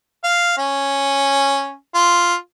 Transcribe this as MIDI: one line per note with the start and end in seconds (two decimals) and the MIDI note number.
0.24 0.56 77
0.58 1.75 61
1.95 2.34 65